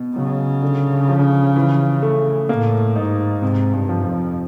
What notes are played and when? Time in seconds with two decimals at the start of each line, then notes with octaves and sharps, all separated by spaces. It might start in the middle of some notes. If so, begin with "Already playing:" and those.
Already playing: B2
0.15 C#3 F#3
0.63 D3
1.09 F3
1.56 E3
2.02 A3
2.49 A2 A#3
2.96 G#2 D#4
3.42 G#2 C3
3.74 G2
3.89 F3
4.05 F2